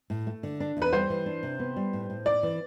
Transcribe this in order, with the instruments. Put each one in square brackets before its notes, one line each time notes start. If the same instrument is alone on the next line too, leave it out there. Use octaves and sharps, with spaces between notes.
[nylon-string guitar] A2
A3
D3
D4
E2
[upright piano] B4
[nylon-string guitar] G3 [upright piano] C5
[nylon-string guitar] E3
D4
C3
B3
G3
A2
A2
[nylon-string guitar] A3 [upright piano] D5
[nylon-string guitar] E3